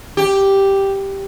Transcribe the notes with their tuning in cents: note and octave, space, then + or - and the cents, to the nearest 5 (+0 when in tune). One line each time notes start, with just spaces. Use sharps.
G4 +0